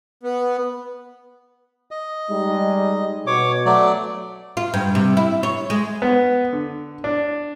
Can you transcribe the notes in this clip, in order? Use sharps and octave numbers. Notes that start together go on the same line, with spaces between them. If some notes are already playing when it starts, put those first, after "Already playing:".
B3
D#5
G3 G#3 D#4
B2 C#5 D6
F#3 A3 D5
F4
G2
C3
E4
C#5
G#3
B3
D3
D4